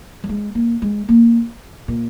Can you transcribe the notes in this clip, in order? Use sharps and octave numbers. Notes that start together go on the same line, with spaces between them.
F#3
G#3
A#3
G#3
A#3
A#2